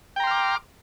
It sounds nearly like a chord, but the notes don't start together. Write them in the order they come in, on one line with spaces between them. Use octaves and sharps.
G5 A#5 C6 F6 D6